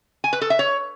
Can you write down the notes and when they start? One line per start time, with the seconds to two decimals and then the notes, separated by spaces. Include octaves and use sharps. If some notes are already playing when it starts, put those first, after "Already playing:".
0.24 G#5
0.33 B4
0.41 A4
0.50 E5
0.59 C#5